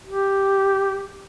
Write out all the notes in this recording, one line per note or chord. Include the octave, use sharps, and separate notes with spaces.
G4